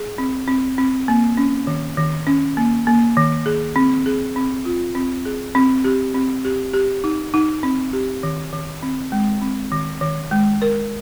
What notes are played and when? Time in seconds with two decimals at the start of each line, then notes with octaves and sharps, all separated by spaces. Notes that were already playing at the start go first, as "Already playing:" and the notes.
Already playing: G#4
0.18 C4
0.48 C4
0.78 C4
1.08 A#3
1.37 C#4
1.67 D#3
1.97 D#3
2.27 C#4
2.57 A#3
2.87 A#3
3.17 D#3
3.46 G#4
3.76 C4
4.06 G#4
4.36 C4
4.65 F4
4.95 C4
5.25 G#4
5.55 C4
5.84 G4
6.14 C4
6.45 G4
6.73 G4
7.04 D#4
7.34 D#4
7.63 C4
7.93 G4
8.23 D#3
8.53 D#3
8.83 C4
9.12 G#3
9.42 C4
9.72 D#3
10.01 D#3
10.31 G#3
10.62 A#4